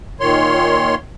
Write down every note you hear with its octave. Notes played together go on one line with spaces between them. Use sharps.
A#2 D#3 C#5 C6